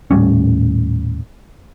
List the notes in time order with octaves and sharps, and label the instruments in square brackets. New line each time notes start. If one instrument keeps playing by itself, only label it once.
[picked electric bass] D#1 A2 G3 C#4